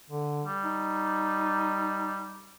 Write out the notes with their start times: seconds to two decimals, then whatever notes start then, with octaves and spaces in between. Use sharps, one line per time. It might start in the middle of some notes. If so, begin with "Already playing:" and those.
0.10 D3
0.46 G3
0.64 D#4